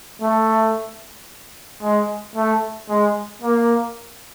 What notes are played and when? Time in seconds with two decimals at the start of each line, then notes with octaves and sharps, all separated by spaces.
0.22 A3
1.82 G#3
2.35 A3
2.89 G#3
3.42 A#3